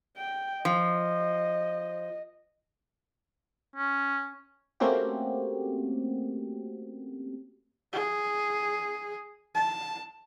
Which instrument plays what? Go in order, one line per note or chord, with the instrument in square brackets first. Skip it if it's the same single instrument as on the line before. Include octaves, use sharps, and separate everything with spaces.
[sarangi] G5
[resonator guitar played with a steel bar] F3 [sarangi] D#5
[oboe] C#4
[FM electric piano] A3 A#3 C4 C#4 F#4 G4
[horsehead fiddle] G#4
A5